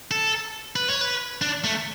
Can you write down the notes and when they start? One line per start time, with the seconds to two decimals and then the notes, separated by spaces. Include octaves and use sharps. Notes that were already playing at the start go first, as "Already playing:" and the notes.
0.11 A4
0.76 B4
0.89 C#5
1.01 B4
1.42 D4
1.64 A3